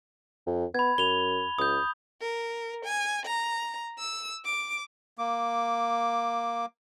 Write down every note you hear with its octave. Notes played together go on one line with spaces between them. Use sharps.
F2
B3 B5 G#6
F#2 F7 G7
C#2 D#6 G6
A#4
G#5
A#5
E6
D6
A#3 D6